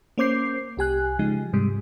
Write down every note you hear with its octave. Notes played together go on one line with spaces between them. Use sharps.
A#3 C#4 C5 D6 G6 C7
C2 G4 G#5 F#6
C#3 F3 G#3 D#4
G#2 C3 G3 G#3